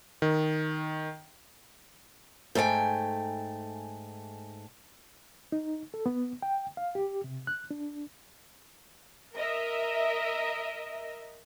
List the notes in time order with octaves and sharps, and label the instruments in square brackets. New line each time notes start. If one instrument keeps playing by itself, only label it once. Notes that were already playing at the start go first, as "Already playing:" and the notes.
[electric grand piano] D#3
[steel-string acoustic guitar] G#2 A3 B4 G5 G#5
[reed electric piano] D#4
A4
B3
G5
F5
G4
C3
F#6
D4
[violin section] A#4 D#5 E5